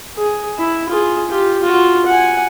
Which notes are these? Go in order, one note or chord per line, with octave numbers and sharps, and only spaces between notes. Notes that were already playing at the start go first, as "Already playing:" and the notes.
G#4
E4
F4 G#4
F4 G4
F4 F#4
F#5 G#5